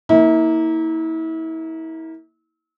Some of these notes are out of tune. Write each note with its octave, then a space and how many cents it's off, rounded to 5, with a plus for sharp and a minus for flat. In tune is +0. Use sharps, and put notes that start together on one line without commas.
A#3 +0 E4 -35